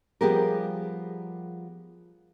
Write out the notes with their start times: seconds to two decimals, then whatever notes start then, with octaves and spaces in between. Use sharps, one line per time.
0.21 F3 G3 B3 G4 G#4 A#4